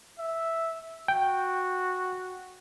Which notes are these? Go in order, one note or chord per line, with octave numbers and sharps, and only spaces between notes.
E5
F#4 G5